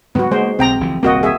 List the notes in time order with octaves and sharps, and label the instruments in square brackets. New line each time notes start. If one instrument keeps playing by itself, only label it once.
[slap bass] G#2 D3 F#3 [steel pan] B3 F#4
[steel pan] G#3 C5 [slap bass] A#3
[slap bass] B1 [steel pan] C4 G5 A#5
[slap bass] F#1 E3 F3
[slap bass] D#1 C2 C4 [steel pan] A#3 F#4 D#5
[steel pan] G#4 E5